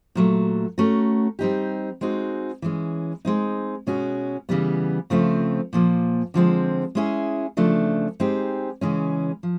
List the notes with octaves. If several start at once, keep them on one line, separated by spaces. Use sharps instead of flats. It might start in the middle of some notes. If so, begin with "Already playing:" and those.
A#2 F#3 A3
A3 C#4 F#4 A#4
G3 C4 D#4 G4
G#3 C4 D#4 F#4
E3 G#3 C#4
G#3 C4 D#4
B2 G#3 C#4 F#4
C#3 E3 G3 B3
C#3 F3 A3 C4 F4
A#2 F3 A#3
D3 F3 G#3 C4
G#3 C#4 E4 G#4
C#3 F3 A3 D4
G#3 C4 D#4 G4
C#3 E3 G#3 C#4
F3